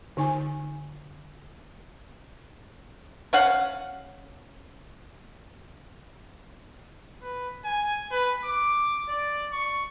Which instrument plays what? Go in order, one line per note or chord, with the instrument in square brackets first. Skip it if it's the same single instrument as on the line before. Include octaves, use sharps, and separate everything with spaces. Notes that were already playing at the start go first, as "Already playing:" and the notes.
[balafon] D3 D#4 G#5
[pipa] C#4 F5 F#5
[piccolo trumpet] B4
G#5
B4
D6
D5
C#6